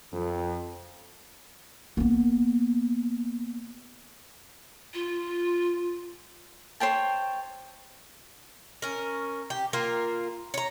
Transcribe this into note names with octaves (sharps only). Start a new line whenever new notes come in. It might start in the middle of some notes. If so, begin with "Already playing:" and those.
F2
A#3 B3
F4
C5 C#5 G5 A5
C#4 A#4
G4
A#3 F4 A#4
C#5 A#5